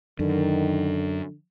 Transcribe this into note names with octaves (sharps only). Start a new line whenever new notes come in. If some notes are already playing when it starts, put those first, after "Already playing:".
F#2 D3 D#3